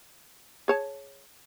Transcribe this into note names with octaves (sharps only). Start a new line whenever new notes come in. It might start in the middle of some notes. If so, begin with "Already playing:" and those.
G#4 C#5 A5